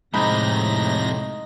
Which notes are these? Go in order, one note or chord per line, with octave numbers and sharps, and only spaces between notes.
F2 A2 C3 G#3 D#4 B5 A#6